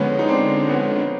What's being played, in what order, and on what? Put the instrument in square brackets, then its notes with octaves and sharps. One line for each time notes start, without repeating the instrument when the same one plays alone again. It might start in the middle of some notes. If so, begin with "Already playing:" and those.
Already playing: [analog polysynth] D3 F3 G#3 [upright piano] B3 C#4
[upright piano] D#4
C4 D4
B3 C#4